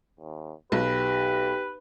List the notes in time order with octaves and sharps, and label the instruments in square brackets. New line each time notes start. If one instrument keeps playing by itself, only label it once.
[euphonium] D#2
[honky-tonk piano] B1 [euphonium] G4 [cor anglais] B4